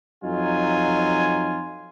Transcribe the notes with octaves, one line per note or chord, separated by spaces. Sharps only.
F2 F#3 D#4 F4 G#5